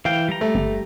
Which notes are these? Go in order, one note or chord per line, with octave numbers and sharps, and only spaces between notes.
E3 F5 G5
G3 A#5
A3
G1